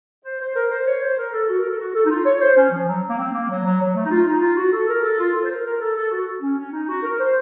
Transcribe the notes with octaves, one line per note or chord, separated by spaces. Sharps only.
C5
C5
A#4
C5
C#5
C5
A#4
A4
F#4
A#4
A4
F#4
A4
D#4
F4
C#5
C5
C#4
F3
F#3
A#3
C4
A#3
F#3
F#3
F#3
A3
D#4
F4
D#4
F4
F#4
A4
A#4
A4
F4
A4
C5
A#4
A#4
A4
A4
F#4
C#4
C#4
D#4
F#4
A#4
C5